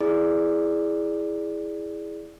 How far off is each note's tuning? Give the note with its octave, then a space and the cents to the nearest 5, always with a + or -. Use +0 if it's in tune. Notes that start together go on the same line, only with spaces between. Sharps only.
E4 +0 G#4 +0 D5 +0